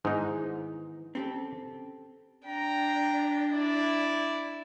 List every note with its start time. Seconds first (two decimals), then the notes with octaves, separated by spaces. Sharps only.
0.05 G#2 D#3 E3 B3 D#4
1.15 C4 C#4 G4 A4
2.46 D4 G5 A#5
3.53 E4 D5